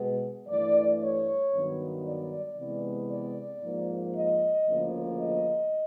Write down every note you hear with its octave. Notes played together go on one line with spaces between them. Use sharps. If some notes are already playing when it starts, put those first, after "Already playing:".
Already playing: B2 G#3 B3
G2 E3 A3 D5
C#5
G2 D#3 F#3 B3
D5
C3 E3 G#3 B3
D5
G#2 F3 A#3
D#5
D2 C#3 F3 A#3
D#5